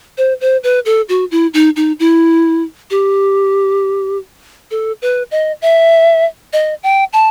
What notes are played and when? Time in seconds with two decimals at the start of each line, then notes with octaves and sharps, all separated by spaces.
0.17 C5
0.41 C5
0.63 B4
0.85 A4
1.09 F#4
1.31 E4
1.54 D#4
1.76 D#4
1.99 E4
2.90 G4
4.71 A4
5.02 B4
5.31 D#5
5.62 E5
6.53 D#5
6.83 G5
7.13 A5